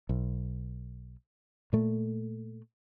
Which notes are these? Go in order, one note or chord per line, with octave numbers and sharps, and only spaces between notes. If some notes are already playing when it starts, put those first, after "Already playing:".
B1
A#2 A3